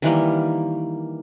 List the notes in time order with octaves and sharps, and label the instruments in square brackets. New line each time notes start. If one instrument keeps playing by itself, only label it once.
[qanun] D#3 E3 G3 A#3